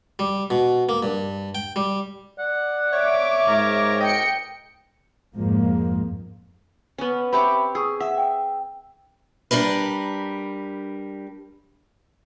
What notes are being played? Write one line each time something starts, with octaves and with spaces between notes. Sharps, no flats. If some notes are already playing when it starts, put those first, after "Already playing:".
G3
B2
A#3
G2
G5
G3
D5 F#5
C#5 E5 D6
G#2 A#4
D#5 G5 C#7
F2 G#2 F3 A#3
B3 C#4
C4 G4 C#5 E5 B5
G#4 C#6 D#6 E6
E5 F#5
G5
G3 D4 A#4 B4